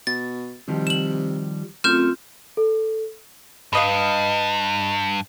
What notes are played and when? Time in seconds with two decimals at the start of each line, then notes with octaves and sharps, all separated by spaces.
0.07 B2 A6
0.68 C3 D#3 F3 G3
0.87 E7 F#7
1.84 F#2 A3 C4 F4 F6 G6
2.57 A4
3.73 G2 B4 D#5 F5